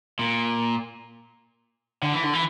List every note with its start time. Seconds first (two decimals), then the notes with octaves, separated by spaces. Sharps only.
0.19 A#2
2.02 D3
2.12 E3
2.23 D3
2.33 E3